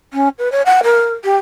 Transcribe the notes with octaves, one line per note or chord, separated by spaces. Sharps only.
C#4
B4
C#5
F#5
A#4
G4